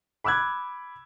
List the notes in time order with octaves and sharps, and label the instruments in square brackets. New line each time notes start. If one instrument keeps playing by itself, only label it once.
[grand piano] B5 D6 E6 F#6 G#6